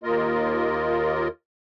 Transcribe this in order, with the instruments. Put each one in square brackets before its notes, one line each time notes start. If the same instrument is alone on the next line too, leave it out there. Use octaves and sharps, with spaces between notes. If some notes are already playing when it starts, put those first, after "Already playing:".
[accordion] D#2 A#3 F4 A#4 D#5